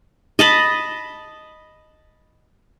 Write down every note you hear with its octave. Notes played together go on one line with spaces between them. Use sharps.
D#5 A5 B5